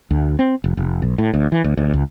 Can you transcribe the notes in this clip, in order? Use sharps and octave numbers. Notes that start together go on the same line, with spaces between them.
D2
C4
F1
F1
B1
A2
D2
E3
D2
D2
C#2